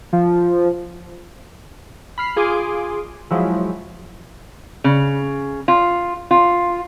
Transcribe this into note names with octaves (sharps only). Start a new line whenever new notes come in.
F3
B5 F6 C7
F4 G#4 C6 D6
F3 F#3 G#3 E4
C#3
F4
F4